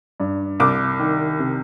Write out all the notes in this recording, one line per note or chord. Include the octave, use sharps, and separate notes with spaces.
G2
C2 D6
D#3
C3